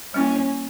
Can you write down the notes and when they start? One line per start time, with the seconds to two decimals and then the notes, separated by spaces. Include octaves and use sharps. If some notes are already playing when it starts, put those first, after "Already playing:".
0.14 G3 A#3 C#4 E4